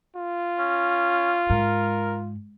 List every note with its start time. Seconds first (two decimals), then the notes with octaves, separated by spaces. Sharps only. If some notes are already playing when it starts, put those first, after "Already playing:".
0.16 F4
0.59 C#4
1.50 G#2 A#4